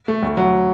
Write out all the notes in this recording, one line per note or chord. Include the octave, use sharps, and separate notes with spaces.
A3
D2
F#3